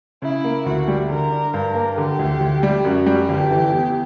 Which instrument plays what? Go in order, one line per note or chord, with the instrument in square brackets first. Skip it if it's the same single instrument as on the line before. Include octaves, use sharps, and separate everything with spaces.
[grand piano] C#3 [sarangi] E4
[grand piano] A#3
[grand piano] D2 [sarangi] F#4
[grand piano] G3
[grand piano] D3 [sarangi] A#4
[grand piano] D4
[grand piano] G2 [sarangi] A#4
[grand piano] A#3
[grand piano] D3 [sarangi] G4
[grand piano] D2
D2
G3
[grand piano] F#2 [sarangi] F#4
[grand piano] G3
[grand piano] G1 [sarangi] G4
[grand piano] E3
E2